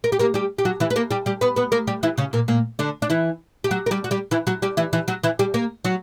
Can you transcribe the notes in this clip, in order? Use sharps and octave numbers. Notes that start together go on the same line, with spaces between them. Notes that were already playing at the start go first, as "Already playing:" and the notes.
A#4
G4
A#3 A#4
G3 G4
G4
F#3 F#4
E3 E4
B4
A#3 A#4
G3 G4
G3 G4
B3 B4
B3 B4
A#3 A#4
G3 G4
E3 E4
C#3 C#4
A#2 A#3
A#2 A#3
D3 D4
D4
E3 E4
G4
F#3 F#4
A#4
G3 G4
F#4
G3 G4
E3 E4
F#3 F#4
G3 G4
E3 E4
E3 E4
F#3 F#4
E3 E4
G3 G4
A#3 A#4
F#3 F#4